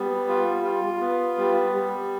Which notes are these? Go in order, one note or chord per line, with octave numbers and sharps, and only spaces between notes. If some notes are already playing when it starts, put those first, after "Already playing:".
Already playing: G3 B3
F4
F4
B3
G3
G3